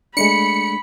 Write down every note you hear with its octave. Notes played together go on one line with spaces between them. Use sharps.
G#3 A3 D4 B5 C#7